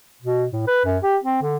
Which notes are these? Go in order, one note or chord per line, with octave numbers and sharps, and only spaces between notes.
B2
A2
B4
F#2
G4
C4
D3